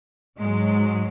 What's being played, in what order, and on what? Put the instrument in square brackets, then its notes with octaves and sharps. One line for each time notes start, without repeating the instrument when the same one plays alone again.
[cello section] G#2 F#3 G#3